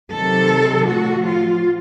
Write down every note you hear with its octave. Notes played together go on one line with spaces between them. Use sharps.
C3 D#3 F#3 A4
A2 F3 F#4
F4